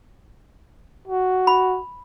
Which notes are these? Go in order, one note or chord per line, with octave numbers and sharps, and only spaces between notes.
F#4
B5